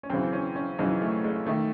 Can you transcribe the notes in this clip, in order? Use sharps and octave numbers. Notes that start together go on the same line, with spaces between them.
C#4
F#2 C#3 E3 C4
C#4
C#4
F#2 C#3 E3 D#4
A3
G#3
D#3 A3